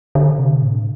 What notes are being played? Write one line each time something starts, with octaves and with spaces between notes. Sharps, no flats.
D3
C3
A2